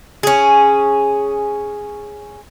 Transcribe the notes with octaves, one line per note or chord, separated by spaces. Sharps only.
C#4 G#4